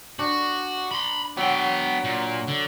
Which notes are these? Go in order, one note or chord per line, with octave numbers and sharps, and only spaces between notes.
D4 F#4
B5 C6
F#3 B3 G5
A#2
D3